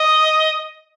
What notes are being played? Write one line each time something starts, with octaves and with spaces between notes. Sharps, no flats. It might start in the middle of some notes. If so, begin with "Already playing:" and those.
Already playing: D#5